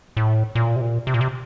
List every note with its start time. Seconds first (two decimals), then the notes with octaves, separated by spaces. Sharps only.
0.17 A2
0.55 A#2
0.76 C3
0.81 A#2
1.07 C3
1.14 A#2
1.21 C3